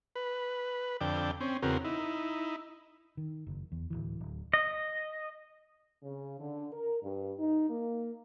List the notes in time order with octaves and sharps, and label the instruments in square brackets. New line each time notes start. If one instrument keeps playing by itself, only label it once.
[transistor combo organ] B4
F2 D3 D5 G5
C4 C#4
E2 C#3 C4 F#4 A#4
D#4 E4
[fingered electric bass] D#3
F#1
E2
D1 C2 E3
D1
[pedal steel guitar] D#5
[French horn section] C#3
D3
A#4
G2
D#4
A#3